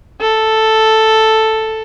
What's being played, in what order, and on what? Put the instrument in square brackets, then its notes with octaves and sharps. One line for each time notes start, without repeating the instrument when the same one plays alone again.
[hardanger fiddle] A4